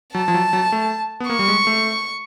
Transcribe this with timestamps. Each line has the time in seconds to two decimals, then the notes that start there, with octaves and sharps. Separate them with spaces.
0.15 F#3 A5
0.28 F3
0.34 F#3
0.53 F#3
0.72 A3
1.20 B3
1.29 A#3 C#6
1.39 G3
1.48 G#3
1.67 A3